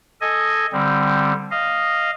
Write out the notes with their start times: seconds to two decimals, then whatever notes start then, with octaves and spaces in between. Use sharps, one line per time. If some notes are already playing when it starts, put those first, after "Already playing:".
0.21 A4 D#5 G#5
0.72 D3 G3 C4
1.51 D#5 F5